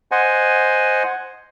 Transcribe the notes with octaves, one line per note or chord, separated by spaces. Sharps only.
C5 D#5 F#5 G#5